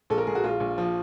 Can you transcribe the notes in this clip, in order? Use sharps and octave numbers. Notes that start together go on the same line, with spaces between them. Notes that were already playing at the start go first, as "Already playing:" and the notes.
A#1 A4
A#4
A#1 G#4
F#4
A#1 F4
A#1
F3